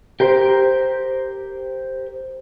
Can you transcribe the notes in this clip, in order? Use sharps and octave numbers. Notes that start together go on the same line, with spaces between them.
G4 A#4 C5